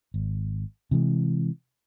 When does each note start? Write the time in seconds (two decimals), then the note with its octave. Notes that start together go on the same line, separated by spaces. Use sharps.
0.14 G#1
0.91 C3 E3 G#3